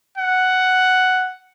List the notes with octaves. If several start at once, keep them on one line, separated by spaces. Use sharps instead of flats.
F#5